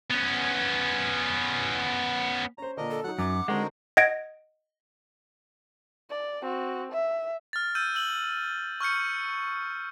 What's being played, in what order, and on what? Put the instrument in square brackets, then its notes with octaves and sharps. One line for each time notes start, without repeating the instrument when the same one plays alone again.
[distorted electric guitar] B3 C#4
[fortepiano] C#4 C5 [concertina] A#5
[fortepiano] A#2 D3 [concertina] D4 A#4 D#5
[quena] A4
[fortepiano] F#3 D#4 [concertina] F#5 F#6
[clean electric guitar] F#2 [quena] D6
[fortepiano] D3 C4 F#5 [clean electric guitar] G#3 [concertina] D#4 F#4 A#4
[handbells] D#5 F#5 G#6 A#6 D7
[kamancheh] D5
C4 F#4
E5
[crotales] F6 A6
E6 G6 D#7
E6 F#7
C#6 F6 G6 C#7